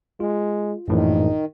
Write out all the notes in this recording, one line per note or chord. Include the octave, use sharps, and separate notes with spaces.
G#3 F4
A#1 F#2 A2 D#3 E3